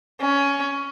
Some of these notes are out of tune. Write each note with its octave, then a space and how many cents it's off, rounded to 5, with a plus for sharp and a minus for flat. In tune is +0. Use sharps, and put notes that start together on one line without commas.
C#4 +15